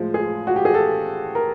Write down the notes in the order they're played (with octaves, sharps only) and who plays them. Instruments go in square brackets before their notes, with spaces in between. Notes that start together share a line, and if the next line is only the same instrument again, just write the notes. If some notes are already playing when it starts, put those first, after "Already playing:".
Already playing: [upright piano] A2 F3 G#3
G#4
F#4
G4
G#4
A4
A#4